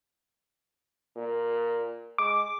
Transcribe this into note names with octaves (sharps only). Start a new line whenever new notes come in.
A#2
G#3 D6